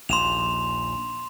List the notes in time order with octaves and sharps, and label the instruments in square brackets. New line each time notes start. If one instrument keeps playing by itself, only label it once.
[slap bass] A#1 D#2 [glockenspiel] C6 E7 F7